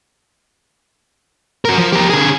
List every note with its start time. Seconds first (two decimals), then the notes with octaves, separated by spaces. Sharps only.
1.65 F#4 A#4
1.78 F3
1.93 G4 A#4
2.10 D3 G#4